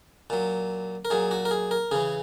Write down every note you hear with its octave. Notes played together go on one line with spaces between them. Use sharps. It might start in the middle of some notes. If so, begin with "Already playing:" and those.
A#2 F#3
A#4
A#2 F#3 G#4
F#4
A#4
G#4
A#4
C#3 E3 G#4